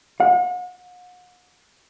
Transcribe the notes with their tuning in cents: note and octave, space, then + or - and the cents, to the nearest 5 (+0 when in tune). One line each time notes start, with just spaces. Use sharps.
F#5 -40